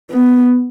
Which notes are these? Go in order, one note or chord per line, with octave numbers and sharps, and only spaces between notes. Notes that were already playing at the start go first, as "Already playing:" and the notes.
B3